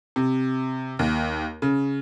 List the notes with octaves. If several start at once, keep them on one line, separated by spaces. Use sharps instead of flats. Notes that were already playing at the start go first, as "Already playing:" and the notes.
C3
D#2
C#3